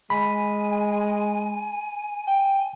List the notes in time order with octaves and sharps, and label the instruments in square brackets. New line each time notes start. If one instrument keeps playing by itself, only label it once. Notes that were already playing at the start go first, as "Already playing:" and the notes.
[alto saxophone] G#3 [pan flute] G#5 [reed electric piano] B5
[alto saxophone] G5